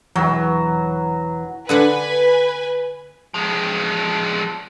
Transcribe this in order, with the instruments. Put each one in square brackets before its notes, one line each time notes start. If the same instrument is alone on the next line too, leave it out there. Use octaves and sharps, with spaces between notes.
[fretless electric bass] E1 E2 [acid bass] E3 [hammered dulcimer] F#3
[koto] D3 D4 F#5 [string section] B4 G#5
[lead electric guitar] F3 G#3